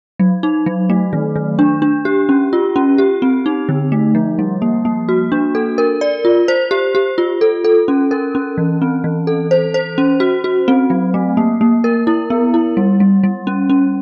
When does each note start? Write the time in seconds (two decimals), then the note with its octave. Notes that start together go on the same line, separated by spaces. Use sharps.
0.20 F#3
0.43 D#4
0.66 F#3
0.90 A3
1.13 D#3
1.36 D#3
1.59 D4
1.82 D4
2.05 G4
2.29 C#4
2.53 F4
2.76 C#4
2.98 G4
3.22 C4
3.46 D#4
3.69 D3
3.92 A3
4.15 F3
4.39 G3
4.62 A#3
4.85 A#3
5.09 F#4
5.32 D4
5.55 A4
5.78 A#4
6.01 D5
6.25 F4
6.48 C5
6.71 G4
6.95 G4
7.18 F4
7.41 A4
7.65 A4
7.88 C#4
8.11 A#4
8.35 C#4
8.58 E3
8.82 C4
9.04 E3
9.27 A4
9.51 C5
9.74 C5
9.98 C#4
10.20 F#4
10.44 F#4
10.68 C4
10.90 F#3
11.14 A3
11.37 A#3
11.61 A#3
11.84 A#4
12.07 E4
12.30 B3
12.54 E4
12.77 G3
13.00 G3
13.24 G3
13.47 C#4
13.70 C#4